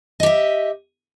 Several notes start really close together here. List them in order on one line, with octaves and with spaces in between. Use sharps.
D#5 G4 E5